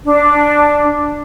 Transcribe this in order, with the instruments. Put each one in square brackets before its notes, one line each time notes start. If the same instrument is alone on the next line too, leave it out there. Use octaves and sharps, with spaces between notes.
[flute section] D4